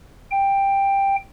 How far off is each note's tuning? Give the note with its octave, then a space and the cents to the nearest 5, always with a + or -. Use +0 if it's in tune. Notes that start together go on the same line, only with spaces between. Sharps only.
G5 +10